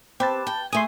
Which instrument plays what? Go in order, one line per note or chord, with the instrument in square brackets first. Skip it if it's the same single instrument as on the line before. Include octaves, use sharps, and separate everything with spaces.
[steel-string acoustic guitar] C4 [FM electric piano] G4 B4 A5
[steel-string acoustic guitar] G5
[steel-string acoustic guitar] A3 G#4 [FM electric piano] C6 D#6